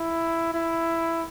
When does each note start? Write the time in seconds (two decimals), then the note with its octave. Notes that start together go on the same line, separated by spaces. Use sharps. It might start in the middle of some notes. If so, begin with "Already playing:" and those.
Already playing: E4
0.54 E4